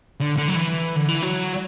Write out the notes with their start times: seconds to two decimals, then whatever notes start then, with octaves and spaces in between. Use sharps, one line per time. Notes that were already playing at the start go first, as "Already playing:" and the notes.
0.20 D3
0.37 D3
0.48 F#3
0.55 E3
0.96 D3
1.08 E3
1.22 F#3